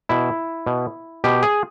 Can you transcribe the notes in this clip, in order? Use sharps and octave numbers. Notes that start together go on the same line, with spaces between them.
B2 E4
B2
B2 G4
G#4